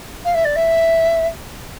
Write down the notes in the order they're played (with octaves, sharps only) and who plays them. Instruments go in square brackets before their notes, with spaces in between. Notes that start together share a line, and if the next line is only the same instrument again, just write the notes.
[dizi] F5
E5
D5
E5